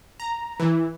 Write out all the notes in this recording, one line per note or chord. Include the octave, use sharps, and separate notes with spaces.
A#5
E3